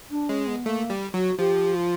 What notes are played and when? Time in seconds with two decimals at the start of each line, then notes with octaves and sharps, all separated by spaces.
0.11 D4
0.29 G#3 C#4
0.47 B3
0.65 A3 A#3
0.90 G3
1.14 F#3 F#4
1.38 F3 G4
1.75 F4